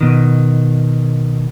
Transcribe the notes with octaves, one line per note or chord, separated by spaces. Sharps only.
B2 D#3